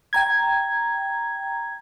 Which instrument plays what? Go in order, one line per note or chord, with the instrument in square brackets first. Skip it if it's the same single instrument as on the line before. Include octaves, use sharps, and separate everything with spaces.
[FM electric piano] G5 A#5 G#6